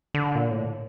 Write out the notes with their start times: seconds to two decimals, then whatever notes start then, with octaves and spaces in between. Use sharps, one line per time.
0.14 D3
0.35 A#2
0.50 A2